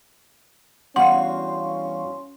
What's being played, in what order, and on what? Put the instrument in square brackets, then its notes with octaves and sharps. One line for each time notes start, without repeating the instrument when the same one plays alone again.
[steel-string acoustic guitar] E2 G2 F#4 [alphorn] C#4 [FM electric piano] F5 C6 [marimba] F#5